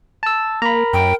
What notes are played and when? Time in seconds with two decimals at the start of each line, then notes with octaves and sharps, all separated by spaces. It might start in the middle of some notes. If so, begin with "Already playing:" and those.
0.23 A5 E6
0.62 A#3 A#4 A#5 B5
0.93 F#2 G5